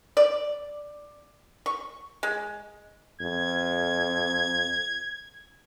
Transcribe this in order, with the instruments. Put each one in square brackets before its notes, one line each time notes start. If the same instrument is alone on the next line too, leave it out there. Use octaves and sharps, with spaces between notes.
[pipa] D5
C#6
G#3
[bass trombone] F2 [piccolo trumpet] G#6